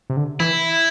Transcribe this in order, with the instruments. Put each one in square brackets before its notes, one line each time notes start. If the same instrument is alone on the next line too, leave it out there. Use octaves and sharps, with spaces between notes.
[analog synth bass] C3
D3
[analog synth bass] E3 [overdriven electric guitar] E4